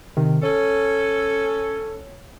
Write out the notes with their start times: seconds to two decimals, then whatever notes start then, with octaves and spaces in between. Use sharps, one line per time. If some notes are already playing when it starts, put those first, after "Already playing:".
0.17 C3 D#3
0.43 C#4 A4 C#5